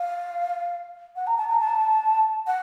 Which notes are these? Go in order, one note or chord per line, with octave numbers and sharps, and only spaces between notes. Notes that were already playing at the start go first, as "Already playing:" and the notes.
Already playing: F5
F#5
A#5
A5
A#5
A5
F#5